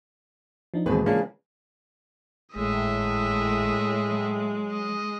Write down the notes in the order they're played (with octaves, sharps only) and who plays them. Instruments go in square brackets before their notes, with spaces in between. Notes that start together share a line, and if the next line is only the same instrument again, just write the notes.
[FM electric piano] F3 D4 D#4
[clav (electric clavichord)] D#2 B2 [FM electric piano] E3 G#3 G#4 [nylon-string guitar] F#3 C4 B4
[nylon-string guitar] C#3 F4 [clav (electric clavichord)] A#3 C#4 D4
[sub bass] G#1 [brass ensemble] A2 [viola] G#3 [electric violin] D#5 E5
[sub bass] F#3
[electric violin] D#5